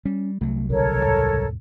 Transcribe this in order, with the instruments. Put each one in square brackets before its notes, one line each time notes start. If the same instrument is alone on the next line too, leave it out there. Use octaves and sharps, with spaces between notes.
[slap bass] G3 [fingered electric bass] C#4
[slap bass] C2 F#3 [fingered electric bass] A3
[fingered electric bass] A1 B2 D3 [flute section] A4 A#4 C#5
[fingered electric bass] D#2 G#2 B2